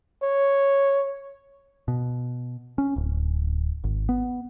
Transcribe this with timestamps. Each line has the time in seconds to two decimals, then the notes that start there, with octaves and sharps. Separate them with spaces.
0.22 C#5
1.88 B2
2.78 C#4
2.96 D1
3.84 G#1
4.09 B3